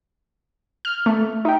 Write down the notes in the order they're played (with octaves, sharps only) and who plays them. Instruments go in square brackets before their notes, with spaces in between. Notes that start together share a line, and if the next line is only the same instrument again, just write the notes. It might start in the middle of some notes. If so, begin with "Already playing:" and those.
[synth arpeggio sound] F6
A3
[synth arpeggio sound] D#4 [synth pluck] E5 G5